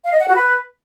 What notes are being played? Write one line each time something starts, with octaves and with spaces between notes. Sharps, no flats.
F5
D#5
F#5
F#4
B4